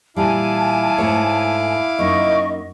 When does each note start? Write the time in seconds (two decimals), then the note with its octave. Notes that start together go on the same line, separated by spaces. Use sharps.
0.16 A#2 E3 G3 E4 F5 G#5 A5 D6
0.98 G#2 A3 C#5
1.99 F#2 A#3 D#4 D#5 C#6